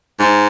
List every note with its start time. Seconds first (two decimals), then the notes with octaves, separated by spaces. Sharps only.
0.20 G#2